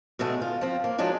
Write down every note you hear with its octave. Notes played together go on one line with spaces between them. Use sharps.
B2 D3 G#3 A3
F4
F3 C4
A#3
F3 F#3 G#3 D4 D#4